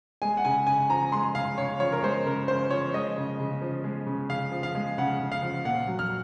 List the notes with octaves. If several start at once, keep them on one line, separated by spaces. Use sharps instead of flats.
G#3 G#5
F#5
C#3 G#5
C#3 G#5
F3 A#5
G#3 C6
C#3 F5
C#3 C#5
F3 C#5
A#4
G#3 C5
C#3 A#4
C#3 C5
F3 C#5
G#3 D#5
C#3
C#3
F3
G#3
C#3
C#3 F5
F3
F5
G#3
C#3 F#5
C#3
F5
F3
A#2 F#5
F#3
F6